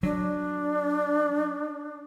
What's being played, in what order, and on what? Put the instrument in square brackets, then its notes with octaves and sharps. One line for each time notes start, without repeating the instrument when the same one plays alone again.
[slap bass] F#3 [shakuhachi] D4